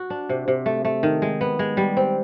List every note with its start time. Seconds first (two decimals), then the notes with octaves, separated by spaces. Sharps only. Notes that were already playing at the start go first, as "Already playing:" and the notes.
Already playing: F#4
0.10 D4
0.29 C3
0.48 C3
0.66 A3
0.85 A3
1.03 D#3
1.22 G#3
1.41 B3
1.59 G#3
1.77 G3
1.97 C4